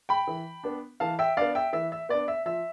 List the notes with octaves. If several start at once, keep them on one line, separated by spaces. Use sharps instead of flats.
G5 B5
E3
B3 D4
E3 F5 A5
E5 G5
B3 D4 D5 F5
E5 G5
E3 E5
E5
B3 D4 D5
E5
F3 E5